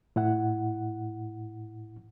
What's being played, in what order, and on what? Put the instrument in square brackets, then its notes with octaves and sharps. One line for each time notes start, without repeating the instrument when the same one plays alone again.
[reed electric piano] A2 E4 F#5